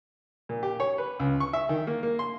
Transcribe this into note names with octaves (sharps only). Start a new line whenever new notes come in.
A#2
G4
C#5
B4
C#2
C#6
E5
D#3
A#3
A#3
C6